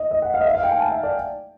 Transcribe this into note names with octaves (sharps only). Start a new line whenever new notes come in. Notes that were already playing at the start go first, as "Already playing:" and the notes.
Already playing: D#5
D#5
F#5
F5
D#5
E5
F5
G5
G#5
A5
E5
D5